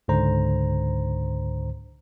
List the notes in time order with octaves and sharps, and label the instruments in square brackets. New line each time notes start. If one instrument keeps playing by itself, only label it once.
[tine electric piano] C#2 G#2 D3 C5 A#5